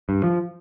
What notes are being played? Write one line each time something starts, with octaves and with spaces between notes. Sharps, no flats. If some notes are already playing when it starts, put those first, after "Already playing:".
G2
F3